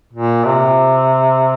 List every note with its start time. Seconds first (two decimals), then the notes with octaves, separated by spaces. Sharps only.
0.13 A#2
0.45 C3